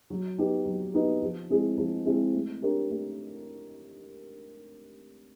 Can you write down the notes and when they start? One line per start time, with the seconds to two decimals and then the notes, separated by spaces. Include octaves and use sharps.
0.10 F#3
0.38 B3 D#4 G4
0.65 F#3
0.93 B3 D#4 G4
1.22 F3
1.50 G#3 C4 E4 G#4
1.78 F3
2.06 G#3 C4 E4 G#4
2.34 A3
2.62 D4 G4 A#4 C#5
2.90 A3